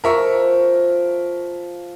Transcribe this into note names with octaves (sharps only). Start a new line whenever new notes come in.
F3 A#4 E5 F5 C#6